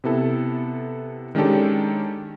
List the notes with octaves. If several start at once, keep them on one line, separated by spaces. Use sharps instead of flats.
C3 B3 E4 A4
D#3 G#3 C#4 D4 G4 A4